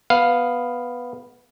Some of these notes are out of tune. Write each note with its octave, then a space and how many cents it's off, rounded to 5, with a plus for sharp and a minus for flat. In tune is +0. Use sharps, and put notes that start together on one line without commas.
B3 +0 F5 +5